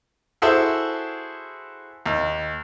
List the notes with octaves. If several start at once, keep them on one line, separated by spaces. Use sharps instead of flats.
E4 F#4 G#4 A4 C5 E5
D#2